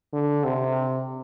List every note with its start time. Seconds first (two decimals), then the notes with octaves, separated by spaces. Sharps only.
0.13 D3
0.44 C3